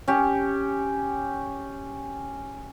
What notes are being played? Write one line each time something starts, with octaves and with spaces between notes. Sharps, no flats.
C#4 G4